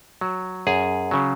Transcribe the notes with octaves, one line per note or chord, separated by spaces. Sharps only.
F#3
F#2 G#4
C#3 F#3